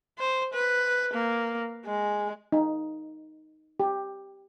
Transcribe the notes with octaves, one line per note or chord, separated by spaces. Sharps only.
C5
B4
A#3
G#3
D#4
G4